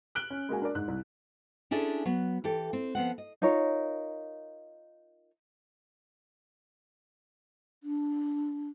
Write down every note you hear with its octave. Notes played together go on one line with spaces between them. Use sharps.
F6 F#6 D7 F#7 G7
C#4
G#3 A#3 F#4 G#5
D4 A#4 D5
G#2 F#6
C2
C#4 D4 E4 G#4 A4 D5
F#3 B3
E3 G4 A4
C4
F3 B3 C4 F#5
D#5
D#4 F4 A#4 C#5
D4